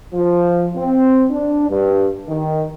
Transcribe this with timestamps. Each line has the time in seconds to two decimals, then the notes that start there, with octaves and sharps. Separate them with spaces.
0.14 F3
0.76 C4
1.31 D4
1.69 G2
2.28 D#3